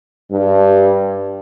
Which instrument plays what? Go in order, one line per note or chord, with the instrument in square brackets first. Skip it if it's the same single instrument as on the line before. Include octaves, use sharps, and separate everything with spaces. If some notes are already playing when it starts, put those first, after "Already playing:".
[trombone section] G2